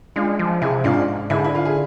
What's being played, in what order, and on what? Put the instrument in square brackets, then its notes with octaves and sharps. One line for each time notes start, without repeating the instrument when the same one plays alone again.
[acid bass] G#3 [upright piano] D4 F4
[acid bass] F3
[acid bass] C3 [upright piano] E4 G#4
[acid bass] G#2 [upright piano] D4 F4
[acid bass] D3 [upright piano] E4 G#4
[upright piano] E4
F4
G#4